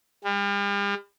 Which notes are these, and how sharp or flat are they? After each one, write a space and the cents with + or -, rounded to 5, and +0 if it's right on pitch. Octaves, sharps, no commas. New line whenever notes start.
G3 +45